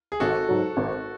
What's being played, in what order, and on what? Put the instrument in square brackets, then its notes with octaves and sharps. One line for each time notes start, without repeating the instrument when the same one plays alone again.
[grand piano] G#4
[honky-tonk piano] G#1 [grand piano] F#4 A4
[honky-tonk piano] G#2 F#3
G#1